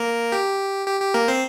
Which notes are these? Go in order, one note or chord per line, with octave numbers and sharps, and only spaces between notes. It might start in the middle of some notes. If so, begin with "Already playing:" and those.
Already playing: A#3 A#4
G4
G4
G4
A#3 A#4
C4 C5